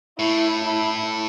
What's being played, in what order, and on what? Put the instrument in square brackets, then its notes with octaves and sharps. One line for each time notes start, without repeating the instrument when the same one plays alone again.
[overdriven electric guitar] A2 [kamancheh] E4
[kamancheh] E4